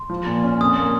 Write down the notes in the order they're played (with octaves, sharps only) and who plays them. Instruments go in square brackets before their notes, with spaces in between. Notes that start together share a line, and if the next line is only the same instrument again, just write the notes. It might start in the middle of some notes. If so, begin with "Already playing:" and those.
Already playing: [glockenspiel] C6
[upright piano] F3
A#2
C#4
[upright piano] F2 [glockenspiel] D#6
[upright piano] A#3